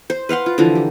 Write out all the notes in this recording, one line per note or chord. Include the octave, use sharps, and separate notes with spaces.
C5
B4 F5 F#5 C6
F4
D3 E3 F3 A#5
G4